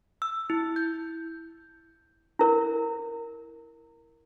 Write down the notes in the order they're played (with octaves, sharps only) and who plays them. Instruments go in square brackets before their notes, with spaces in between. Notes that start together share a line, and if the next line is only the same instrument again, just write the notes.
[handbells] E6
E4
G6
[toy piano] E4 A#4